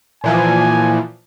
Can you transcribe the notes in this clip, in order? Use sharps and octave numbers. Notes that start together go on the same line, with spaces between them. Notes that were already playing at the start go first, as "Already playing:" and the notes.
A#2 E3 F3 G#5